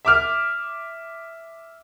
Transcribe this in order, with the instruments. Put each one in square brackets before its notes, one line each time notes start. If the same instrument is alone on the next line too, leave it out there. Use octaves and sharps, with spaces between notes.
[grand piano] E5 D6 F6